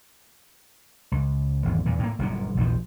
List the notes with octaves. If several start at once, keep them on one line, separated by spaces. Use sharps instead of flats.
C#2
G#1 E2
E2 A#2
A2 A#3
G1 F#2 A#2
A#1 E2 D3 F3